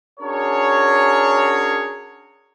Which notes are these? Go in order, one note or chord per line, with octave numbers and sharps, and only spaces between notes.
C#4 D4 F#4 G#4 A#4 C#5